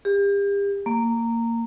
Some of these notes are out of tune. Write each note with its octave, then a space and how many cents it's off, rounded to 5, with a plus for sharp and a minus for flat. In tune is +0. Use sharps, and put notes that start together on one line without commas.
G4 +35
A#3 -15